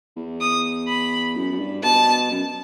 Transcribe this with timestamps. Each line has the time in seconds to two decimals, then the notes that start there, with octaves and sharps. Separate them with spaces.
0.17 E2
0.41 D#6
0.88 B5
1.36 F#2
1.52 F#2
1.59 G2
1.83 B2 A5
2.31 F#2